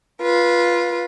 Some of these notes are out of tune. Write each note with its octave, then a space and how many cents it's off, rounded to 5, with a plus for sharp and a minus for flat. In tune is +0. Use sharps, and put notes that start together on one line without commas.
F4 +0 B4 -20